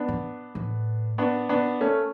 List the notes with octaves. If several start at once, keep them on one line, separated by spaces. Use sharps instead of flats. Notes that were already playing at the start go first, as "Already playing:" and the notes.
Already playing: B3 D4
A2
A2
B3 D4
B3 D4
A3 C#4